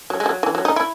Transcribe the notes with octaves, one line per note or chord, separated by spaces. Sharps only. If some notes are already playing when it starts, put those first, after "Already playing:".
F#3
G#3
F#3
E3
F#3
D#4
E4